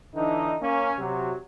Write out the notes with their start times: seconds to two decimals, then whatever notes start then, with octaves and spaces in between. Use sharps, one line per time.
0.15 D3 E3 D#4
0.61 A#3 C#4
0.98 C3 F#3